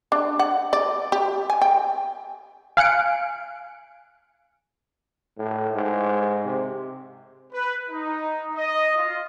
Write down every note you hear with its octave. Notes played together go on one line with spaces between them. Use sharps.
D4
F#5
D5
G4
G#5
G5
F5 G#5 F#6 C#7 D7
A2
G#2
C3
B4
D#4
D#5
F4